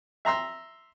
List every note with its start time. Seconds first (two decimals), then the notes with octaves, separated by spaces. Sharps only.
0.25 E5 A#5 C6 E6